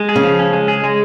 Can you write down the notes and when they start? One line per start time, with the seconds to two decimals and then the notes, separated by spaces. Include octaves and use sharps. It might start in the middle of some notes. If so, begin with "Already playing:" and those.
Already playing: G#3
0.09 G#4
0.16 C#3
0.23 F3
0.39 C#4
0.53 G#3
0.68 G#4
0.84 G#3